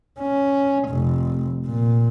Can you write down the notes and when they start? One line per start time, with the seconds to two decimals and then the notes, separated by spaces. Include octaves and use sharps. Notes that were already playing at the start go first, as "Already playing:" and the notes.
0.20 C#4
0.89 F1
1.66 A#2